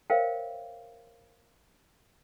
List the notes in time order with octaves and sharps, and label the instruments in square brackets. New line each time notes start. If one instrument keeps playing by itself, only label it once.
[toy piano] A#4 C5 C#5 E5 F5 G5